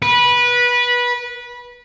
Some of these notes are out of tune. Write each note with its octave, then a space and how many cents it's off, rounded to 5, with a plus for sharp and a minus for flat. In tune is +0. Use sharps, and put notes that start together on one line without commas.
B4 -20